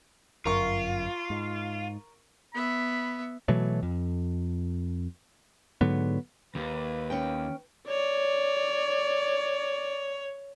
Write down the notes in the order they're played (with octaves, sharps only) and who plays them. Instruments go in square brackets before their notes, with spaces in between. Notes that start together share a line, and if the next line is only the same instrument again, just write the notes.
[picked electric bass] G1 F#2 [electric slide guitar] F4 [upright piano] A#4 C#6
[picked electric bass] G#2
[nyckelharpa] B3 E5 [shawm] B5
[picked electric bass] B2 E3 F#3 A3
F2
G#2 D3 F#3 B3
[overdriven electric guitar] D#2 [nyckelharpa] B4
[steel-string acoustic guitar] C#4 G5
[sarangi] C#5 [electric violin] D5